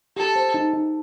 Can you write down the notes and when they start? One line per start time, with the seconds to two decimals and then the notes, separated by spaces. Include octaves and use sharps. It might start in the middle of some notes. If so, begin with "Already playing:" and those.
0.16 G4 A4
0.36 C5
0.54 D#4
0.73 D#4